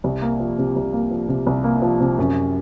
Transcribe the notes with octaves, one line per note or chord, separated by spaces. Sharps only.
C2
A#3
F3
C3
C2
A#3
F3
C3
C2
A#3
F3
C3
F#2